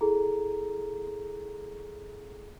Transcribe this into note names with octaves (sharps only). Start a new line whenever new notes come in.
E4 G#4 A4 A#5